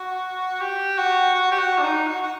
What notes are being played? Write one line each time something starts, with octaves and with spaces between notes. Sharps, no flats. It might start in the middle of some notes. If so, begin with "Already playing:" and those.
Already playing: F#4
G4
F#4
F#4
G4
F#4
D4
D#4
F#4
F#4